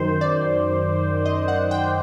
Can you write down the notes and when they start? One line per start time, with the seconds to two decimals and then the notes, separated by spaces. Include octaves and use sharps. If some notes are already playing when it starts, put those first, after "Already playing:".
Already playing: F#2 D#3 C5
0.21 D5
1.26 D#5
1.48 F#5
1.71 G5